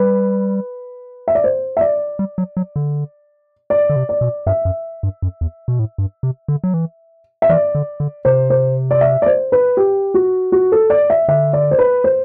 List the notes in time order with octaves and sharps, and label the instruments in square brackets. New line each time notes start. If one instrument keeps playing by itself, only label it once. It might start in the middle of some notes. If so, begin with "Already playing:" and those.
Already playing: [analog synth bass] G3 [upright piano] B4
[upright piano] E5
D5
C5
E5
D5
[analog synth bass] G3
F#3
F#3
D3
[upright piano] D5
[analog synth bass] D3
C3
[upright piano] D5
[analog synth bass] B2
[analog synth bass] G2 [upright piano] E5
[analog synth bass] F#2
G2
F#2
E2
B2
A2
G2
C3
D3
F#3
E3
[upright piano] E5
[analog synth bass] E3 [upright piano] D5
[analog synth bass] D3
D3
[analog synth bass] C3 [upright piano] C5
[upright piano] C5
D5
E5
D5
C5
B4
G4
F#4
F#4
A4
D5
E5
[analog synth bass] D3 [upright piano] E5
[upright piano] D5
C5
B4
C5